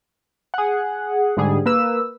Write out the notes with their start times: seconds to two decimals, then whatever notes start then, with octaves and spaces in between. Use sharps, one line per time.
0.54 G#4 F#5
1.37 G#2 D3 G3 G#4
1.66 A#3 B4 E6